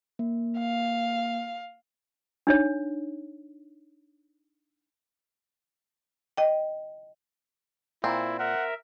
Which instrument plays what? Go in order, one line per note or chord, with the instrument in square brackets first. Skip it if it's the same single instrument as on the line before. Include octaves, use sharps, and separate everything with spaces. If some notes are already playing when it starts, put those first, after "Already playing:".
[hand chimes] A#3
[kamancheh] F5
[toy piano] D4 D#4 C#5
[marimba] D#5 G5
[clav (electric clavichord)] A#2 [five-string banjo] C4 [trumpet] E4
[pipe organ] A#4 E5 [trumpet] F#5